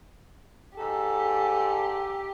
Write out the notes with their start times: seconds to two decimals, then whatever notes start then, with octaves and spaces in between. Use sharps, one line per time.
0.78 G#2 G4 A4